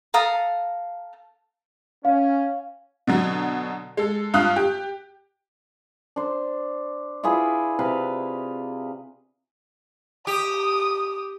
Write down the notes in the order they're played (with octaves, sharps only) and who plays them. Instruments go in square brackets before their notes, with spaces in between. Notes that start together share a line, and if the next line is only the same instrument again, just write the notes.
[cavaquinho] A4 F5 A#5 D#6
[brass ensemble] C#4 [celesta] F5
[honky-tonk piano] B2 D3 F#3
G#3 A4
G2 F4 F5 D#6 F#6
G4
[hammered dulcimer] D4 C5
E4 F4 G#4 B4
C3 B4 F5
[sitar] G4 [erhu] D#6